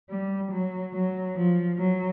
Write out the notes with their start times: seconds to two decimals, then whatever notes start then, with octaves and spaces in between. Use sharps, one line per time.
0.11 G3
0.52 F#3
0.94 F#3
1.36 F3
1.78 F#3